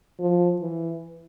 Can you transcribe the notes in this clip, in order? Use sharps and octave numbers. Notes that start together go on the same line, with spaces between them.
F3
E3